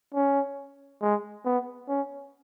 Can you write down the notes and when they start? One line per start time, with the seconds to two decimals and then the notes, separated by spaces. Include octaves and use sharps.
0.14 C#4
1.02 G#3
1.45 B3
1.88 C#4